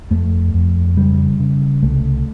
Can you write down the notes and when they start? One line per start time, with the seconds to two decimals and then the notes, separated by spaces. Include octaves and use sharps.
0.11 F2 A3
0.54 F2
0.97 C#3 G3
1.40 C#3
1.83 C2 A3